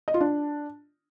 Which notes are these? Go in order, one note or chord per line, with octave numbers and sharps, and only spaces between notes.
D#5
F4
D4